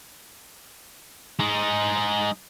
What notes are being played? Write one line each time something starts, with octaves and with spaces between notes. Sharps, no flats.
G#3 D#4